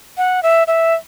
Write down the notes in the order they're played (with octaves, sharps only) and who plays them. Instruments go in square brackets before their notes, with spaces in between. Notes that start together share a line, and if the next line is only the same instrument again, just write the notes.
[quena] F#5
E5
E5